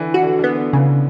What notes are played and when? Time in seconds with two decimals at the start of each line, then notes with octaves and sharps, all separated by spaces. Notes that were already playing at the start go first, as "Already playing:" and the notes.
Already playing: D3 E3
0.14 E3 F#4
0.23 D3
0.39 D3 B3
0.73 C#3